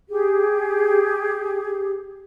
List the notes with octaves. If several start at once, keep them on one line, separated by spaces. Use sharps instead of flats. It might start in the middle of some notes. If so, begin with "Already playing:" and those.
G4 G#4